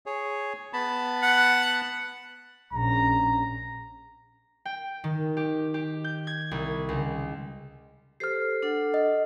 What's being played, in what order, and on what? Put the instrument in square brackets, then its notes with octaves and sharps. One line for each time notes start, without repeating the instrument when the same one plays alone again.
[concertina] G#4 C#5
B3 A5 B5
[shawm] F#5
[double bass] A#1 C#4 [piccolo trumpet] A#5
[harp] G5
D#3
G4
G4
G6
G#6
C2
C#2
[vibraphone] G4 A4 C5 [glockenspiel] F6 C7
[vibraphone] D4 A4 F#5
[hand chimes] D#5